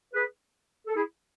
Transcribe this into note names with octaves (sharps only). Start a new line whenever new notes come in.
G#4 B4
A4
E4 G#4